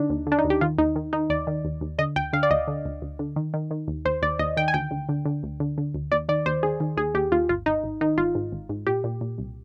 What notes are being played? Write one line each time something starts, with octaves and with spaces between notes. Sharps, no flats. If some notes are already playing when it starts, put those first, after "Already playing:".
Already playing: D3 D4 D#4
D#2
D3 D4
D#4
D#2
G4
D#3 F4
D#2 D#4
D#3
D#3 D#4
D#2 D5
D#3
D#2
D#2
D3 D#5
D2 G5
D3 F5
D5
D2 D#5
D3
D2
D2
D3
D#3
D#3
D#3
D#2
D#2 C5
D#2 D5
D#2 D#5
D#3 G5
G#5
D2 G5
D2
D3
D3
D2
D3
D3
D2
D#2 D5
D#3 D5
D#2 C5
D#2 G#4
D#3
D#2 G#4
D#2 G4
D#2 F4
G#1 F4
G#1 D#4
G#1
D#3 D#4
G#1 F4
G#2
G#1
G#2
A#2 G4
A#2
A#2
C2